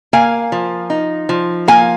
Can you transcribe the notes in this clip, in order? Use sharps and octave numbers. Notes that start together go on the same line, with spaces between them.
A#3 F5 G#5
F3
D#4
F3
A#3 F5 G#5